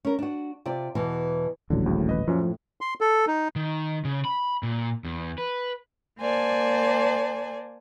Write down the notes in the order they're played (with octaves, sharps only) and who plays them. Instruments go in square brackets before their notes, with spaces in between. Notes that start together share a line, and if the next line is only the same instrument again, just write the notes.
[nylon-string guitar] C#4 A#4
D4 F#4
C3 F4 D5
E2 B2 E3
[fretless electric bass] D#1 A1 F#3 [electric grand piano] D3
[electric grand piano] D2 A2 C#3
B4 D#5
[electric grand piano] F#2 A#2 C#4 [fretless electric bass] F3
[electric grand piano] A2
[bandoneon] C6
A4
D#4
[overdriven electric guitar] D#3
C#3
B5
A#2
E2
B4
[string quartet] A#3 C5 D5 G#5 A5